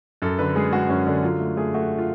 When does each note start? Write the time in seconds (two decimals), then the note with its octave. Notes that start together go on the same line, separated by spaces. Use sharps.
0.22 F#2 A4
0.39 D3 B4
0.56 G#3 G#4
0.72 G#3 F#4
0.89 F#2 C#4
1.07 D3 D4
1.23 F#3 F4
1.40 A3
1.57 A3 G#4
1.74 A3 F#4
1.98 F4